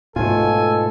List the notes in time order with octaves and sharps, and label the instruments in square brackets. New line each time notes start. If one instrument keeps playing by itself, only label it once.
[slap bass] G#2 B2 [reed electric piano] A3 F4 [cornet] A4 [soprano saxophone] G#5